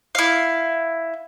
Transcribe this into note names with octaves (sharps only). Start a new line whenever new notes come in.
E4 F5